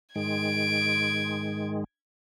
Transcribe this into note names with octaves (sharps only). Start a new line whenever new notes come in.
G#2 D#3 G#3 G#6 D7